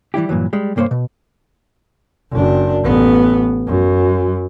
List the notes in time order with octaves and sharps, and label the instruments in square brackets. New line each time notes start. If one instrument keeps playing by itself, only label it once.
[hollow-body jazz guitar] E3 G3 E4 G4
G2 A#2 E3 F#3
G3 G#3
C2 G2 A#3 C5 C#5 C6
B2
[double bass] F#1 D4
A1 B3
F#2